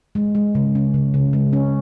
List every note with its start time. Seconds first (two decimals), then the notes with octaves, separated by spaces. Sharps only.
0.15 G#3
0.35 G#3
0.55 C#3
0.75 C#4
0.94 C#3
1.14 C#3
1.33 G#3
1.53 C#4